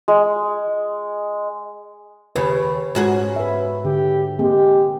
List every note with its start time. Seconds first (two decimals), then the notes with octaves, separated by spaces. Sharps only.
0.08 G#3
2.36 D#2 C#3 G4 B4
2.95 G#2 C#4 F#4 G#4
3.36 B4 E5
3.85 D3 G4
4.39 G#3 A#3 C4 G4